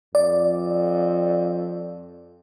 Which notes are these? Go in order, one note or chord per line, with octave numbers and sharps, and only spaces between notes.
F2 D5